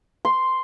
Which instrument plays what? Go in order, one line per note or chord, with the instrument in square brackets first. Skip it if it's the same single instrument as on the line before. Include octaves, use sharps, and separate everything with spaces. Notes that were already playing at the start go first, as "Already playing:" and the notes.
[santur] C6